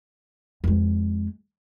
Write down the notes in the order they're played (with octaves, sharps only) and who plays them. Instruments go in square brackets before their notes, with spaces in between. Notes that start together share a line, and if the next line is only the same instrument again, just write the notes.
[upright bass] F2 G#3